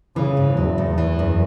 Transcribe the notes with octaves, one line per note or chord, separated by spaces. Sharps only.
C#3 E3
G#2
E2 F#3
A2
E3
F#2